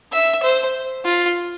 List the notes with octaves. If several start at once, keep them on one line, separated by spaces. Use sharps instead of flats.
E5
C5
F4